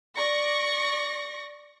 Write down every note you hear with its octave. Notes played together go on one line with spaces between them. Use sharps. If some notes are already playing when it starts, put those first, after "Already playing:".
D5 C#6 A#6